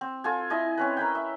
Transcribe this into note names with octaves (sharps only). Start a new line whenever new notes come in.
C4
F4 A4 G#5
E4 D#5 G#5
C4 C#4 B4
A#4 B4 G5
E5